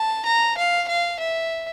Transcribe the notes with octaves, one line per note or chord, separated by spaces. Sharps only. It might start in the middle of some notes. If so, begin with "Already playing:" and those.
Already playing: A5
A#5
F5
F5
E5